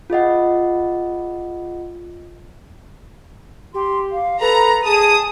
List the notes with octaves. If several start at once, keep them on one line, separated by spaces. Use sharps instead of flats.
F4 G#4 D#5 F#5
G4 C6
F5
A4 B4 A#5
G#4 A5 D#6